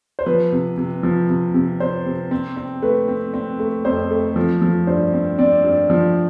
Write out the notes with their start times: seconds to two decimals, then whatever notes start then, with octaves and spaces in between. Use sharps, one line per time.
0.19 C5
0.26 F3 B4
0.52 C3
0.77 C3
1.03 F3
1.29 C3
1.54 C3
1.80 C3 C5
2.06 C3
2.31 C4
2.57 C4
2.82 A3 B4
3.08 C4
3.34 C4
3.60 A3
3.85 F2 C5
4.11 A3
4.36 F3
4.62 F3
4.87 G2 C5
5.13 C4
5.38 C4 D5
5.64 G2
5.90 F3